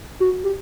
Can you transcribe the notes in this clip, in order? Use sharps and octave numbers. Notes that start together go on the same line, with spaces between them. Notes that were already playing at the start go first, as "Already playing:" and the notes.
F#4
G4